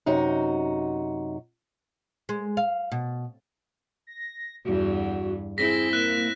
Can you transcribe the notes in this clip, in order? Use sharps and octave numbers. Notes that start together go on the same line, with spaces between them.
F#2 C3 D#4 F#4
G#3
F5
B2
A#6
E2 G2 F#4
C4 E4 G#4 A#6 B6
A#3 F#6 E7